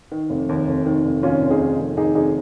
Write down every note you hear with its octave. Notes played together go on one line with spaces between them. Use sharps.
D#3
F1
D#2
F1
D#3
F1
D#2 C#4 F4
F1
D#4 G#4
D#3
F1
D#2 D#4 G#4
F1 D#4 G#4